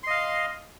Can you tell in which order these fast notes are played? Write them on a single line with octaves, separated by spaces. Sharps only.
C6 D#5 F5